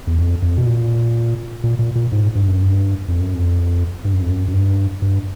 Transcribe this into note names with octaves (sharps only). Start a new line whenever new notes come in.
E2
F2
F2
B2
A#2
A#2
A#2
A#2
G#2
G2
F#2
G2
F2
F#2
F2
G2
F#2
F2
F#2
F#2
G2
G2